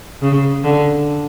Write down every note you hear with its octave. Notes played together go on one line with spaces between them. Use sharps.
C#3
D3